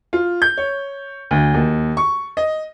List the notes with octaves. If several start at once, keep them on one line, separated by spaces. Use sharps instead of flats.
F4
G6
C#5
D2
D#2
C#6
D#5